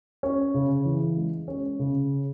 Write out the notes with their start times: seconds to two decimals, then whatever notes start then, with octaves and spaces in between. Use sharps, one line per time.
0.23 C#4
0.54 C#3
0.85 E3
1.17 G#3
1.48 C#4
1.79 C#3